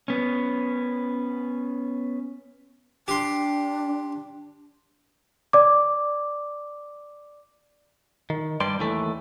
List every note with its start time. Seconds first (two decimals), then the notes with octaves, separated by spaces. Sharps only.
0.08 B3 C#4
3.08 D4 G4 C6
5.53 D5 D6
8.30 D#3
8.60 G2 G3 D5 C6
8.80 D#2 E3 A3